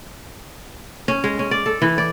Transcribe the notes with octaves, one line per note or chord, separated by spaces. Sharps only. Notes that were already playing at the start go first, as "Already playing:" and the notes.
C#4
G#3
C#4
D5
A4
E3
D5